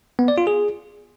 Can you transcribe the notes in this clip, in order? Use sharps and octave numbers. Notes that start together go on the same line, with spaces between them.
B3
D5
F4
G#4